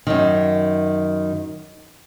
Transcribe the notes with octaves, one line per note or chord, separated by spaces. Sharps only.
F#2 D#3